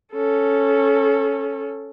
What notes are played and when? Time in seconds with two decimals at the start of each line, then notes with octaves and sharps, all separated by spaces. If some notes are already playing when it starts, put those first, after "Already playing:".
0.13 C#4 A4